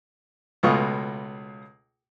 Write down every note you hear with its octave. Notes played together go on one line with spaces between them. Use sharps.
C#2 B2 A3 F4 C#6 D#6